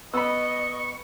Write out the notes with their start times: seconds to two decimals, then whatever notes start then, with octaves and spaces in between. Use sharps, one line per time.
0.14 B3 D#5 B5 C#6 E6